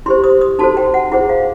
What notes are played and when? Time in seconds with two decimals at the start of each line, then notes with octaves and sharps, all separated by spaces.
0.06 E4 G4 C5 C6
0.24 D#6
0.41 D#6
0.59 D#4 F#4 A4 C5 A5
0.77 G5
0.94 F#5
1.12 E4 G#4 C5 F#5
1.29 F5